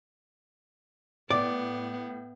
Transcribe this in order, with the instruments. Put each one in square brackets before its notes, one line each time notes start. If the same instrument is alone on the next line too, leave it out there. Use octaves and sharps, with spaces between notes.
[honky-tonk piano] A2 [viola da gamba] B3 [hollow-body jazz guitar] D5 [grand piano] D6